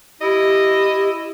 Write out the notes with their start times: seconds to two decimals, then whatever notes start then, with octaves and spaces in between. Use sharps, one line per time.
0.21 E4 G4 D#5